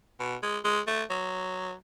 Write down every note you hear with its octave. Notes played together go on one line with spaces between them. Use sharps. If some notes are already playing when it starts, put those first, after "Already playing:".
B2
G#3
G#3
A3
F#3